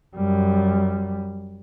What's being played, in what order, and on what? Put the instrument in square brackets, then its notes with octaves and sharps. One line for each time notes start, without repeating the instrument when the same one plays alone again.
[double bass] F#2 G3